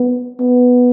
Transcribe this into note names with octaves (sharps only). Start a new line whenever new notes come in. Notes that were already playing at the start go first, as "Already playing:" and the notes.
Already playing: B3
B3